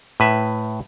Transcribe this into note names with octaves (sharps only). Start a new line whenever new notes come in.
A2 B4 E5